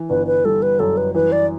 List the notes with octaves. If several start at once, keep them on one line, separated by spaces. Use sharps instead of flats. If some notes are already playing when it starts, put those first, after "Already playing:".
Already playing: E3
G1 B4
B4
G3 A4
B4
F#2 A4
B4
E3 B4
D5